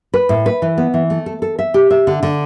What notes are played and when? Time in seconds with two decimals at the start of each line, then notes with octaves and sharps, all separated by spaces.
0.14 B4
0.29 A2
0.46 B4
0.62 E3
0.78 B3
0.94 E3
1.10 A3
1.26 A4
1.42 A4
1.59 E5
1.74 G4
1.91 E5
2.07 D3
2.23 D3